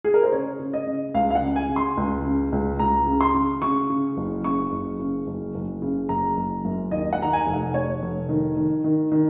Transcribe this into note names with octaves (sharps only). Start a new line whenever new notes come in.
G#4
A#4
C5
C#3 C#5
C#3
D#5
C#3
C#2 F5
F5
F#5
C#3
G#5
C#3
C6
C#2
C#3
C#2
C#2 A#5
C#3
C6
C#3
C#3 C#6
C#3
F#1
C#3 C#6
F#1
C#3
F#1
F#1
C#3
F#1 A#5
F#1
F#2
D#2 D#5
F#5
D#3 A#5
G#5
F1
F#5
F1 C#5
F1
D#3
D#3
D#3
D#3